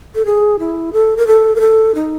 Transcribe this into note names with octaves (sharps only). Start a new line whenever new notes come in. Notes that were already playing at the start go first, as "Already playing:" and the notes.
A4
G#4
E4
A4
A#4
A4
A#4
A4
D#4